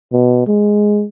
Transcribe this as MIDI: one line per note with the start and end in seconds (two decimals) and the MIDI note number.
0.12 0.44 47
0.47 1.05 56